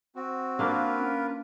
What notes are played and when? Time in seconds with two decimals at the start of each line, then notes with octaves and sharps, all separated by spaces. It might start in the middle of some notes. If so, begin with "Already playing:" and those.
0.15 C4 F#4
0.59 A#3 D4 F4 A#4 B4
1.01 C#4